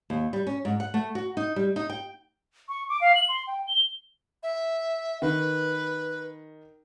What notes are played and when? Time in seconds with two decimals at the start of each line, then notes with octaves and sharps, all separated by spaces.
0.10 D#2
0.33 G3
0.47 C#4
0.65 G#2
0.80 F#5
0.94 A3
1.15 F#4
1.37 D#4
1.56 G3
1.76 D#4
1.89 G5
2.69 C#6
2.89 D6
3.01 F5
3.15 F#7
3.29 C6
3.47 G5
3.68 G7
4.43 E5
5.22 D#3 B4